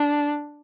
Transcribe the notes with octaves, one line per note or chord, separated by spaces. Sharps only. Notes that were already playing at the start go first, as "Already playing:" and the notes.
Already playing: D4